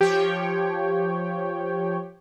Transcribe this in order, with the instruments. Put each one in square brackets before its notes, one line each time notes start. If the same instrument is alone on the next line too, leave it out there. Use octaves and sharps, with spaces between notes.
[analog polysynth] F3 C#5 G5 [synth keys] G4